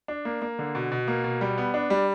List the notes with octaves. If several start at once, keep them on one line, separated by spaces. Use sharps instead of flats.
D4
A#3
A#3
D3
B2
B2
A#3
B2
G3
B3
D4
G3